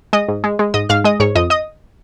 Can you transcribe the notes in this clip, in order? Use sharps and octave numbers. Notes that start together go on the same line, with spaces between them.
G#3 D#5 D#6
G#2
G#3
G#3
G#2 D#5 D#6
G#2 F5 F6
G#3 D#5 D#6
G#2 C#5 C#6
F2 D#5 D#6
D#5 D#6